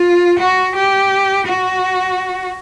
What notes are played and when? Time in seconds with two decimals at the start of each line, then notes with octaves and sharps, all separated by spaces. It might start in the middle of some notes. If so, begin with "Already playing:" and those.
Already playing: F4
0.39 F#4
0.76 G4
1.47 F#4